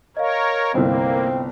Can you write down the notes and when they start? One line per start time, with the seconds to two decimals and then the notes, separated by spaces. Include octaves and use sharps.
0.17 A#4 C#5 D#5 F5
0.74 G1 C2 A#3 C4